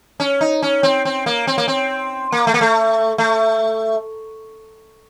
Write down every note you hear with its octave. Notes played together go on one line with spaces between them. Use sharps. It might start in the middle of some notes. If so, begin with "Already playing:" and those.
C#4
D#4
C#4
C4
C4
A#3
C4
A#3
C4
A#3
A3
A#3
A3
A3